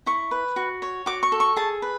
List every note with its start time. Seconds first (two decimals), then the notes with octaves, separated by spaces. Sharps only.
0.06 E4 C#6
0.31 B4
0.56 F#4
0.82 C#5
1.06 F#4 D6
1.23 C#6
1.32 A4
1.40 C#6
1.56 G#4 A5
1.82 B4